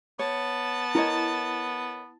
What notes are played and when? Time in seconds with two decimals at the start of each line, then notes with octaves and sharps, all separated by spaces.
0.19 B3 C#5 A5
0.95 E4 A#4 C#5 D#5